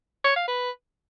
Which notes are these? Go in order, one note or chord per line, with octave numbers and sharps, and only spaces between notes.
C#5
F5
B4